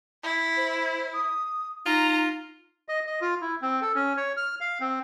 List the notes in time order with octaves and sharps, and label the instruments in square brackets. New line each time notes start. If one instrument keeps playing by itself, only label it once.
[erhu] E4
[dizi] C5
D#6
[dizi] D#4 [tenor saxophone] F4 [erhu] A#5
[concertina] D#5
D#5
F4
E4
C4
A4
C#4
C#5
F6
F5
C4